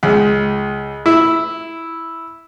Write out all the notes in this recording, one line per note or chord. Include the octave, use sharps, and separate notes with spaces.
C#2
E4